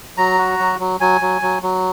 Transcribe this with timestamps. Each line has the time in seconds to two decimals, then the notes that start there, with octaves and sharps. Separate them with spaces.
0.18 F#3 A#5
0.38 F#4
0.59 F#3
0.79 F#3
1.00 F#3 G#5
1.21 F#3
1.42 F#3
1.63 F#3